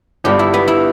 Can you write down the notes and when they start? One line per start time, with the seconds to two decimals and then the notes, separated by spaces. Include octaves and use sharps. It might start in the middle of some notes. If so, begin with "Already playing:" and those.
0.24 G1 G2 G3 G4
0.39 E4
0.54 B3
0.68 E4